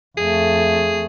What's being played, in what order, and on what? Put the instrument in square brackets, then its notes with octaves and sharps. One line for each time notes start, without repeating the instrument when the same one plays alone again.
[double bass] F2 A3 [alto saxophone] G#4